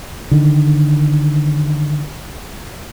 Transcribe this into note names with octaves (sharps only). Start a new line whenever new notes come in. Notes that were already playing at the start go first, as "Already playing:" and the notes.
D3 D#3